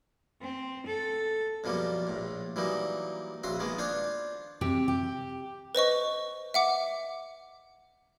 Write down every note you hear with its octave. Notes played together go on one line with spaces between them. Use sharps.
C4
A4
F#2 B2 F3 G3 A#3
A#1 A2
E3 F#3 G3 A#3 D#4
A#1 C#3 F#4 E5 C6
D#3 G#3 A#3 B3
D4 F4 C5 C#5
C3 G4
G4
B4 C5 D#5 C#6
E5 F#5 D6